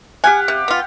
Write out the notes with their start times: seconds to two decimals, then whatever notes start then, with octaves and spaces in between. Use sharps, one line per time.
0.24 G4 F5 F#5 G#5
0.48 C3
0.68 B3 F4